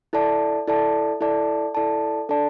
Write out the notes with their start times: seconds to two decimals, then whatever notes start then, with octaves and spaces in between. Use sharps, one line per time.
0.13 E4 A4 D5 A5
0.68 E4 A4 D5 A5
1.21 E4 A4 D5 A5
1.75 E4 A4 D5 A5
2.29 D4 A4 D5 A5